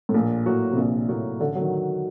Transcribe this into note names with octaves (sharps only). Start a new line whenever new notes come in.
A2
A#1 A#2
A2 F#3 A#3 F#4
C3
A#1 A#2
A2 F#3 A#3 F#4
A1 D3
F#3
D#3